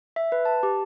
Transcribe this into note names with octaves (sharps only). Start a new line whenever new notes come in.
E5
B4
A5
G4